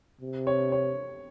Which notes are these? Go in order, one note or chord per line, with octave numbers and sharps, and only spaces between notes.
C3
C#5
C#5